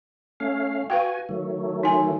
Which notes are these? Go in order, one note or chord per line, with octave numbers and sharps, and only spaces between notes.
A3 C#4 F5
F#4 B4 F5 G5 G#5
D#3 F#3 A3
D#4 G#5